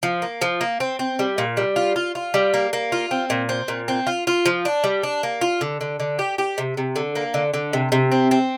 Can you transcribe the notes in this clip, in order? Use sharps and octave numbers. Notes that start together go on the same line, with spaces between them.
F3
A#3
F3
A#3
C4
C4
G3
A#2
G3
F4
F4
F4
G3
A#3
A#3
F4
C4
A#2
C4
A#2
C4
F4
F4
F3
D4
G3
D4
A#3
F4
D3
D3
D3
G4
G4
C3
C3
D3
A#3
D3
D3
C3
C3
C4
C4